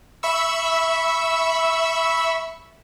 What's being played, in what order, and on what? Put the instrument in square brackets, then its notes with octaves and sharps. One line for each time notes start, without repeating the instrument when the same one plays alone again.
[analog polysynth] E5 B5 C#6 E6